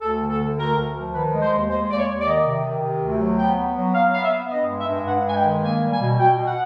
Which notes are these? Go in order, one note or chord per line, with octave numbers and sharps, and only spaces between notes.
D2 A4
D3
A4
D3
D2 A#4
D2
F3
D#3 B4
G#3
C5
D#2
G#3 C5
D#2 D5
C#5
D#2
D5
D#3 D#5
C3
D#3
C3
D2
F#3
B3 G5
B3
F#3
F#3 F5
B3 F5
E5
B3
G2 D#5
G#3
E5
G2
G2 F#5
G#3 G#5
G5
D#3
A#3 G#5
G3
G#5
B2
B2 G5
B2
F#5